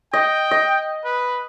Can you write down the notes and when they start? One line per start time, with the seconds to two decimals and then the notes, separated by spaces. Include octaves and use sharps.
0.13 D#5 G5
0.51 D#5
1.05 B4